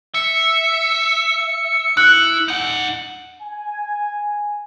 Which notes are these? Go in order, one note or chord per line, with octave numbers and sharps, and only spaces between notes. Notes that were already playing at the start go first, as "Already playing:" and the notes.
E5 C#7
E4 F#6
D#4 F#5
G#5